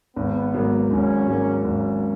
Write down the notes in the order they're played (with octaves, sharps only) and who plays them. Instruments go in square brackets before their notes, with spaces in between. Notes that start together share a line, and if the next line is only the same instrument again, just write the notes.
[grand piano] G#1 [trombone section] B3
[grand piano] G#2 F#3 A#3
[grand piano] G#1 [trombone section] C#4
[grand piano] G#2 F#3 A#3
[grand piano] G#1 [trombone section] C#4